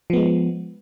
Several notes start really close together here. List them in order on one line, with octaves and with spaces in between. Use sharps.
F3 B3 G#3